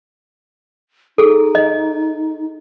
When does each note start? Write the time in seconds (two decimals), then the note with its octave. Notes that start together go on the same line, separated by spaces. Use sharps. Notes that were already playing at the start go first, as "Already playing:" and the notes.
1.18 D#4 G#4 A4
1.55 D#5